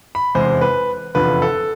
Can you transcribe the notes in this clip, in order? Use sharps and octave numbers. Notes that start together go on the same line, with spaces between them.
B5
F1 E2 C3 G#3 C5
B4
F1 E2 D3 F3 B4
A4